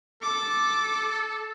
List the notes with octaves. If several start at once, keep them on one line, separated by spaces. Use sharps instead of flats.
A4 D6